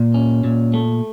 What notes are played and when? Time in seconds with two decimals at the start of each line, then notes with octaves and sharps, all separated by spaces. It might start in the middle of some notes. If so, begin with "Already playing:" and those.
Already playing: A#2
0.14 C#4
0.44 A#2
0.74 A3